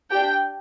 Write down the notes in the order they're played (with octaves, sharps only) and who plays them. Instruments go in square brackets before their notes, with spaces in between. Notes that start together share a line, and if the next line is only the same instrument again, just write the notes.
[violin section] D4 G4 G5